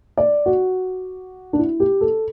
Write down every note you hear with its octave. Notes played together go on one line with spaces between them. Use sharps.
D5
F#4
D4
E4
G4
A4